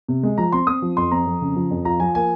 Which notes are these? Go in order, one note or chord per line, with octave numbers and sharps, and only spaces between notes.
C3
G#3
F3 A#5
C4 C6
C4 D#6
F3
F2 C6
C4 A#5
F2
C#3
F3
F2
F4 A#5
F3 G#5
A#3 G#5